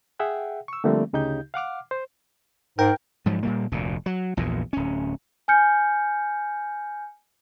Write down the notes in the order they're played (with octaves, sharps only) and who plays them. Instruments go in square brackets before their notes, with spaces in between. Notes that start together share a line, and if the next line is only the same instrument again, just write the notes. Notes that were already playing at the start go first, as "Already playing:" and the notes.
[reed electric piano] G#4 E5 F#5 G5
C#6 E6
D3 F3 G3 A3 A#3 C4
D2 C#3 D#4 G4 G6
F5 F#5 D6 F6
C5
[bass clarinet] G#2 [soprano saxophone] A#4 [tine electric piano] G5
[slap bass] G#2 F3 F#3
A#2 G3 A#3
F1 D2 A#2
F#3
A#1 E2 G2 A#2
D1 C#4
[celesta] G#5 F6 G6 C#7